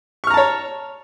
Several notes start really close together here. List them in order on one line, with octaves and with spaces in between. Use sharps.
C#6 F6 A#5 A5 C#5